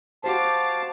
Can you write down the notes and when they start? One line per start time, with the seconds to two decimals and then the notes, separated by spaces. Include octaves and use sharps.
0.24 F#4 G4 C5 F5 A5 D6